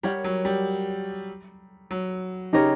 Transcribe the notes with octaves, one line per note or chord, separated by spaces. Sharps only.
G3 A#4 C#5 F#5
F#3
G3
F#3
C#3 D#4 G4 A#4 C#5